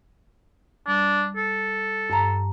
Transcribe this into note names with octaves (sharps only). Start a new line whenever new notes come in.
G3 D4
A4
G2 A5 A#5